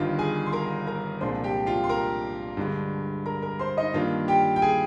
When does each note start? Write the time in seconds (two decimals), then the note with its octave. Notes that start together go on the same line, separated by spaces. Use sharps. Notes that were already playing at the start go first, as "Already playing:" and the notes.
Already playing: G1 G2 D#3 F4 F5
0.19 G#4 G#5
0.46 C6
0.52 A#4 A#5
0.87 A#4 A#5
1.20 C2 A#2 F3 G#3 D4 C5 C6
1.44 G4 G5
1.66 F4 F5
1.84 C6
1.89 A#4 A#5
2.57 G2 D3 G#3
3.26 A#4 A#5
3.42 A#4 A#5
3.59 C5 C6
3.77 D#4 D#5
3.94 G2 D#3 A#3 D4 F4 F5
4.28 G4 G5
4.56 G5
4.62 G#4 G#5